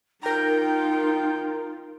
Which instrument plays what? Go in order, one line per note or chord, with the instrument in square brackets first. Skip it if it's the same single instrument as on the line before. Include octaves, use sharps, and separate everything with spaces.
[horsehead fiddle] D#4 F4 [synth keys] A#4 A#5 [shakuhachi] G5